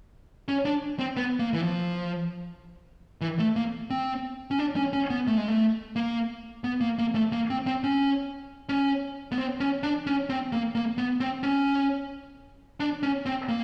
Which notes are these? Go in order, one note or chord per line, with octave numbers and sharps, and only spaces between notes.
C#4
D4
C4
B3
A#3
E3
F3
E3
A3
A#3
C4
C#4
D4
C#4
C#4
B3
A3
G#3
A3
A#3
B3
A#3
A#3
A3
A#3
C4
C4
C#4
C#4
B3
C4
C#4
D4
C#4
C4
A#3
A#3
B3
C4
C#4
D4
C#4
C4
A#3